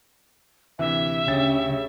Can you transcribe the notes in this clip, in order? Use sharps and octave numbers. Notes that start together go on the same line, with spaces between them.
D2 C3 E3 E5
D2 C#3 G4 A6